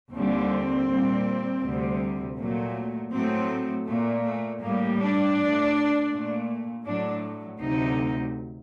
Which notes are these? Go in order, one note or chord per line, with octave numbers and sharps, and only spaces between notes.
D#2 D3 G3 C4
A#2 G3
D2 C3 G3
A#2 F#3 A3
A2 F#3 A3 C4
A#2 A3
A3
A2 G3 A#3
D4
A2 A3
A#2 A3
A2 F#3 A3 D4
D2 C3 F#3 A3 D#4